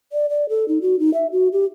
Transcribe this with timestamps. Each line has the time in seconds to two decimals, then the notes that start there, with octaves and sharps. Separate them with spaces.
0.12 D5
0.30 D5
0.49 A4
0.68 D#4
0.82 F#4
0.99 D#4
1.14 E5
1.32 F#4
1.53 G4